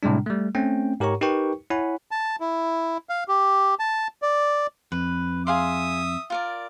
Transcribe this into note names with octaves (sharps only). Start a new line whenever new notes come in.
A2 C3 G3 G#3 D4
G3 A3
A3 C4 C#4 G5
G#2 G4 A#4 C#5 A#5 C#6
D#4 G4 A#4 B4 G5 C#6
E4 C#5 F#5 G#5 B5
A5
E4
F5
G4
A5
D5
F2 B4
G#4 E5 F5 C6 D#6
F4 A#4 D5